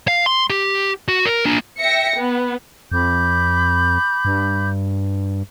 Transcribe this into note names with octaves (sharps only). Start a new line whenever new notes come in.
F5
C6
G4
F#4
A#4
A#3 D4
E5 G5 A#6 C#7
B3
F2 B5 D6 G6
G2